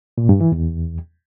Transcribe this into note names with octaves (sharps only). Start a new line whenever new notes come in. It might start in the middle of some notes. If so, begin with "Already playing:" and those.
A#2
G2
E3
E2